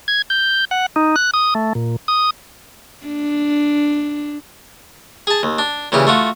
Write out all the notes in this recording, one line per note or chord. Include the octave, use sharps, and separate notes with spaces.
G#6
G6
F#5
D#4
F#6
D#6
A3
A#2
D#6
D4
G#4 A5
D#2
D4
A#2 C#3 E3 G4
A3 F4 F#4